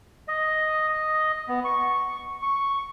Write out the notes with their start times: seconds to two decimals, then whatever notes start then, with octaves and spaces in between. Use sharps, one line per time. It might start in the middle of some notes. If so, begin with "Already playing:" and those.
0.28 D#5
1.48 B3
1.64 C#6
2.42 C#6